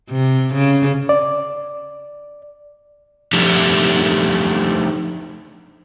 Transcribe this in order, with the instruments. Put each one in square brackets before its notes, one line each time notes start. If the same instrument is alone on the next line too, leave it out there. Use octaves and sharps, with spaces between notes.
[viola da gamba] C3
C#3
[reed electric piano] D5
[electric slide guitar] F3 A3 D4 D#4 G4